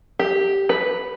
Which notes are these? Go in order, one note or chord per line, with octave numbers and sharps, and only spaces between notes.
G4
B4